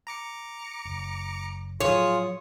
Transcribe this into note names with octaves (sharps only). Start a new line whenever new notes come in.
A#5 D6 C#7
F#1
A2 F3 F#3 F4 G#4 C#5 D#6